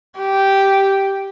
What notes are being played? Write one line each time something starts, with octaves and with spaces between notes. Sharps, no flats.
G4